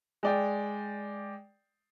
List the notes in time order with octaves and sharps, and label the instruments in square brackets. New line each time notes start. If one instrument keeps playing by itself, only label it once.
[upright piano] G#3 D5 G5